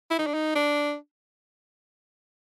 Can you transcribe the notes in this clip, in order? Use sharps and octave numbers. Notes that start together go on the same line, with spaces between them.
E4
D#4
D4
D#4
D4